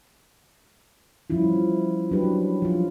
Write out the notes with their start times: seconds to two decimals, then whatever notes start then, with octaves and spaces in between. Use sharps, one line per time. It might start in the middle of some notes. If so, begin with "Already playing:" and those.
1.30 F3 G3 C#4 E4 F4
2.11 F#3 D4 F#4 G4 B4
2.62 F3 F4